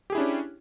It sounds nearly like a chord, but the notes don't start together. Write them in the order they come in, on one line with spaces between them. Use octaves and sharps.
G4 G#4 E4 D4 C#4